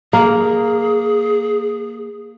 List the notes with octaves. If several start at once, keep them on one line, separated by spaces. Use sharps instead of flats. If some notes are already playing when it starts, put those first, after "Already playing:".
A#3 G#4